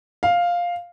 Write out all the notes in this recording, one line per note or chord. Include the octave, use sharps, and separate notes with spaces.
F5